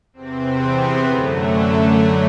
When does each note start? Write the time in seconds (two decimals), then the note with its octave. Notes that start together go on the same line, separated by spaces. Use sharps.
0.13 E2 C3 E3 C4
0.60 B3
1.06 F#2 D3 F#3 A3